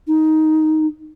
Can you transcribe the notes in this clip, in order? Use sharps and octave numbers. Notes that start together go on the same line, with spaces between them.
D#4